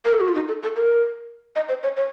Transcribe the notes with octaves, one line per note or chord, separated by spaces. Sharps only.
A#4
A4
F#4
F4
D#4
A4
A4
A#4
D#5
C5
C#5
C#5